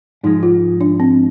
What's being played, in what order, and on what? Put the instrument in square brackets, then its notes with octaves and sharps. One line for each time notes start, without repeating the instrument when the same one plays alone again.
[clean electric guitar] G#2 F3 G#3 [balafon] D#4
[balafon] F4
D4
C4